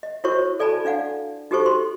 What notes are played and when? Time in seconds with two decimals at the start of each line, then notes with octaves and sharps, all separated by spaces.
0.03 D#5
0.24 E4 F#4 A#4 C5 C#5 C#6
0.60 A4 D5 G#5 A5 B5
0.85 D4 D5 F5 F#5
1.51 D#4 F#4 G4 A4 C5 C#6
1.66 C6